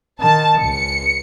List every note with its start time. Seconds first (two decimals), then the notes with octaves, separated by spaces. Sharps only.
0.21 D#3 A5
0.61 C#2 C#7